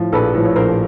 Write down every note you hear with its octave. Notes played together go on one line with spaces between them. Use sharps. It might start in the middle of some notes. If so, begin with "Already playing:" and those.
Already playing: A2 F3
A#1 A4 B4
A2 F3
C#5
A#1 A#4 C5